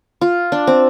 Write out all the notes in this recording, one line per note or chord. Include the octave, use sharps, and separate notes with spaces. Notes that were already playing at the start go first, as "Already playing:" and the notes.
F4
D4
C4